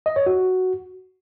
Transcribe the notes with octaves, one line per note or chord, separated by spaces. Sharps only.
D#5
C#5
F#4